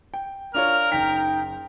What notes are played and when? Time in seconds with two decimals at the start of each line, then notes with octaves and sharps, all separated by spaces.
0.14 G5
0.55 D4 F4 A#4 C#5 F6
0.92 F#1 D#4 G5 B6